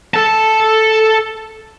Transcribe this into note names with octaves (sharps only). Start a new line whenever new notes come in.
A4 A5